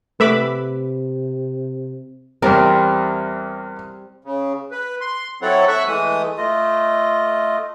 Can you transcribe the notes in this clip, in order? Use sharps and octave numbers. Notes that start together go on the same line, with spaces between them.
C3 A3 B4 E5 B5 D6
E2 G3 C4 A#4
C#3
B4
C6
F#3 C4 E4 A4 C#5 F#5
E5 F#5 B5 C#6 E6 F#6
E3 G#3 A3 D#6
A3 F4 D#5